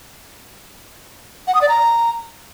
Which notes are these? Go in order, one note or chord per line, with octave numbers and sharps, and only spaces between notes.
F#5
D#6
D5
A#5